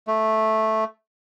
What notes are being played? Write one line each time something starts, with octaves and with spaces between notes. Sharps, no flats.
A3